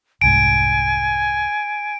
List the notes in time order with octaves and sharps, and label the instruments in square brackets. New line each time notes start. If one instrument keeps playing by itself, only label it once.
[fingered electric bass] F1 C2 G#2 [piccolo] G#5 [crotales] D7